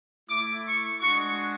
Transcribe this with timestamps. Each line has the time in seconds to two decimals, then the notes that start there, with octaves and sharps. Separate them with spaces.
0.28 A3 E4 D6
0.66 C#6
1.01 G#3 D4 F#4 C#6